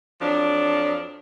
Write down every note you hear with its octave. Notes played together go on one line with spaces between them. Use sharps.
F2 F3 F#3 D4